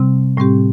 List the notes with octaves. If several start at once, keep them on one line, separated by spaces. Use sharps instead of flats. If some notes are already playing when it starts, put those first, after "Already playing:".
Already playing: C3 G3 C4
A2 G3 C4 G4